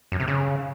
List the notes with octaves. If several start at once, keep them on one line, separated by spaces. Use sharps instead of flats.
F#2
C3
C#3